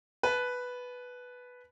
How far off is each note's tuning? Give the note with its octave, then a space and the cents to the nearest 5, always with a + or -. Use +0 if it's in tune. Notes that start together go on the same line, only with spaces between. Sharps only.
B4 +0 A5 -30